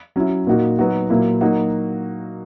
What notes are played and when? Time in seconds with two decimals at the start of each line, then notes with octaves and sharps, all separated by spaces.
0.16 F#3 C#4 E4
0.47 A#2 A#3 D#4 F#4
0.79 F#3 B3 D#4 F#4
1.10 A#2 F#3 A#3 E4
1.41 F#3 A#3 D#4 F#4